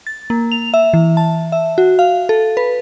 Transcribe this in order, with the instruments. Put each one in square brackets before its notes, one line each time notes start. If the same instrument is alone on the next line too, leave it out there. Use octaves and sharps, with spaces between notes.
[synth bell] A6
A#3
F7
E5
E3
A5
E5
F#4
F5
A4
B4